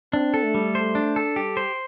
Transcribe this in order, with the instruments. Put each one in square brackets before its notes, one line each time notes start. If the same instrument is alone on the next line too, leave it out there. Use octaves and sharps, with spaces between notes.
[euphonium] C4 [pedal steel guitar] D4
[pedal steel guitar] A4
[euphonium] A3
[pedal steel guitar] G3
C5
D4
A4
[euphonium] G3 [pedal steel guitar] G4
[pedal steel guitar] C5